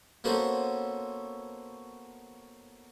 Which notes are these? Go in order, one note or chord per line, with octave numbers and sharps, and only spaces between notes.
A#3 B3 C#4 F#4 A4 C5